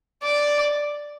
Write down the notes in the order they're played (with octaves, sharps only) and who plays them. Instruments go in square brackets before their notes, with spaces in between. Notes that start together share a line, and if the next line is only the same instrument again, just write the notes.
[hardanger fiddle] D5